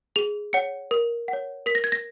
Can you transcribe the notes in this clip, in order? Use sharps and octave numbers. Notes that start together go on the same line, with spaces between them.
G#4 F7
C#5 F#5 C#7
A#4
F#5
C#5
A#4 B6
A#6
G#6
A#6